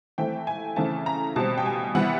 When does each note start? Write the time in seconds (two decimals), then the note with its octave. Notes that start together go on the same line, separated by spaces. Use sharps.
0.18 E3 A3 C4 G5
0.47 G#5
0.76 C#3 E3 A3 C4 A5
1.06 A#5
1.36 B2 G3 C4 A5
1.58 G5
1.66 G#5
1.95 C3 E3 G3 B3 F#5